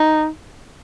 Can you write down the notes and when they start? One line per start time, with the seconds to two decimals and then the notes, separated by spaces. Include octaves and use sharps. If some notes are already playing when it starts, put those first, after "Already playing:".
Already playing: D#4